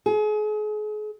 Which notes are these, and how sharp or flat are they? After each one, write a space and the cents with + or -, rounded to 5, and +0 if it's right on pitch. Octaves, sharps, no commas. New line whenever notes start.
G#4 +35